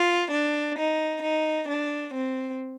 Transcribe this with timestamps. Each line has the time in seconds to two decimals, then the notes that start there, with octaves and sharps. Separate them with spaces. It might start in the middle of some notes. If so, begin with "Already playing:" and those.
Already playing: F4
0.31 D4
0.77 D#4
1.22 D#4
1.68 D4
2.13 C4